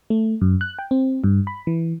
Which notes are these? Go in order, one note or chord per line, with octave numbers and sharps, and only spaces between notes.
A3
F#2
F#6
G5
C4
G2
B5
E3